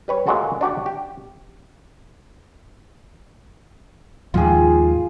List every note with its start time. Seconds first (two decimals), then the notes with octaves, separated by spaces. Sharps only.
0.08 G3 B4 C#5
0.27 A#2 G#3 F#4 A4
0.61 D4 F#4 G4 D5
0.86 G4
4.34 D#2 G#2 F3 F4 G#4